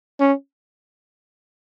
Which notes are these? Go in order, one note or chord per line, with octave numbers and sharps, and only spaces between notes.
C#4